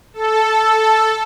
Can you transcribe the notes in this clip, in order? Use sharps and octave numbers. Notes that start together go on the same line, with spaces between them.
A4